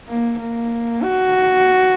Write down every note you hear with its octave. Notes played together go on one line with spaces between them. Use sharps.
A#3
A#3
F#4